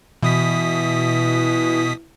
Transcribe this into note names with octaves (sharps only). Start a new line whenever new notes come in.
B2 E3 D#6 B6